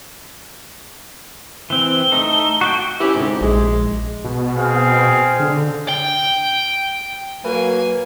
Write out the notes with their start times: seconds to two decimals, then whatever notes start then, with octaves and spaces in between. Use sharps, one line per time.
1.70 E3 C4 G7
2.12 A3 D#4 A4
2.61 F#4 D5 G5
3.01 C#4 E4 G4
3.15 D2 G#2 C3
3.41 A#1 G#3
4.25 B2
4.57 C4 G#4 F5
5.40 D3
5.89 G5
7.45 F#3 A#3 B4 G#5